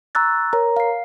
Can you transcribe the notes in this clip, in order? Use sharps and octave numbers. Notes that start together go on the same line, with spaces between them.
A#5 C#6 E6 F#6 A6
A#4 C#5 A#5
F5 C7